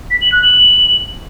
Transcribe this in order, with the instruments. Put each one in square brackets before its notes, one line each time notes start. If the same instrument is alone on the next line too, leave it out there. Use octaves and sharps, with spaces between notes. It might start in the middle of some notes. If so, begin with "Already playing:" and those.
[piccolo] B6
F#7
F#6
F#7